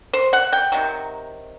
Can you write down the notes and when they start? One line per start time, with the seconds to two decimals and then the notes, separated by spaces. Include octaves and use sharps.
0.13 C5
0.33 F#5
0.53 G5
0.72 C3 D#3 F#3